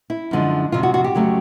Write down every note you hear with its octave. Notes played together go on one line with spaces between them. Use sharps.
E4
F#2 D3 F3 G#3
F2 C3 F3 F4
F#4
F#4
G4
F2 C#3 F#3 A3